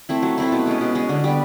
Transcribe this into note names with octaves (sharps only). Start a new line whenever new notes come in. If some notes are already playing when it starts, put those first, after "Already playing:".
A3 C4 E4
F#3
A3 C4 E4
B2
G#3 C#4
B2
G#3 C#4
D3
G3 B3